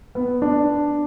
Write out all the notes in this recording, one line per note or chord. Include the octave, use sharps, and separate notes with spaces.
B3
D4